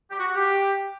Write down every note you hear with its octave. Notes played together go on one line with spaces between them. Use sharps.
G4
F#4
F#5
G4